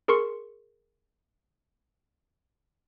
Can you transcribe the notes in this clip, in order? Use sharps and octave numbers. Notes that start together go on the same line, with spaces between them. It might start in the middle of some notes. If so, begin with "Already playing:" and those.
G#4 A#4 C6 C#6 C#7